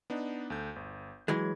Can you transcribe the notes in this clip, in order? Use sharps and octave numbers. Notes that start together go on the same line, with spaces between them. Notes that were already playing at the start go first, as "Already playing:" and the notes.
B3 D4 D#4
D2 A4 G6
G1
E3 F#3 G#3 G#6